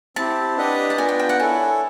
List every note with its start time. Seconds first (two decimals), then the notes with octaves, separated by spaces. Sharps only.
0.16 C4 E4 G4 A5
0.57 D4 G4 B4 D#5 F#5
0.90 A5
0.98 B3 D4 F4 A#4 G#5
1.09 G5
1.20 G5
1.29 F#5
1.40 E4 A4 C#5 G#5